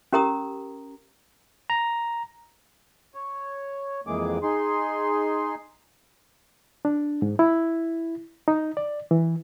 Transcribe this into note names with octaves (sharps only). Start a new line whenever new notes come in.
C#4 G4 A#4 A#5 D#6
A#5
C#5
F2 E3 G#3 A#3 G#4 D6
D#4 G#4 C6
D4
G#2
E4
D#4
D5
E3